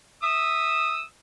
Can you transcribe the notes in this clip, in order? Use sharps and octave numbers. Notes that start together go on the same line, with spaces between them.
E5 D#6 E6